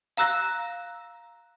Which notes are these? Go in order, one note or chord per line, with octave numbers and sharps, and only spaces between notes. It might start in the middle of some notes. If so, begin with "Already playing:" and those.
F5 A#5 E6 F#6 A#6